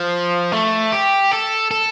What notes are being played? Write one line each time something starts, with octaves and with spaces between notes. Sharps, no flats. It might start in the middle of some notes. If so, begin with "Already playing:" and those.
Already playing: F3
A3
G4
A4
A4